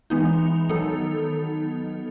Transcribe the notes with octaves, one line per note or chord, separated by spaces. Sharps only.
E3 G#3 B3 D#4
D#3 F#3 B3 D#4 A4